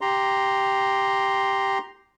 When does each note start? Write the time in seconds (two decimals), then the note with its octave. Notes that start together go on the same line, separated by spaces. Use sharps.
0.01 G4 A#5 C6